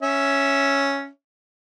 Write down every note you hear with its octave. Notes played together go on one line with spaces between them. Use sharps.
C#4 E5